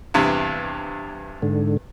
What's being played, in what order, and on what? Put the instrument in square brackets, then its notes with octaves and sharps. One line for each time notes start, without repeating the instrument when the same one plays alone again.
[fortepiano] E2 G2 C3
[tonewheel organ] G#2 D3